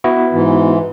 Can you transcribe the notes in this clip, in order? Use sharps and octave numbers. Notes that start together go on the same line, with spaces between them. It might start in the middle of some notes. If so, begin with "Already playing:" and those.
B3 E4 F#4
G#2 E3